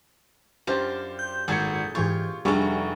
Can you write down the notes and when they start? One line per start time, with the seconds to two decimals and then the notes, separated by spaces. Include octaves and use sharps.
0.67 F#2 D4 F4 G4 C5
1.19 G6
1.48 G#1 A#2 G#4 A4 G#6 C#7
1.95 G#2 E3 F4 G4 C#6 G#6
2.45 F1 F#3 G3 A3 D4 G#4 C#6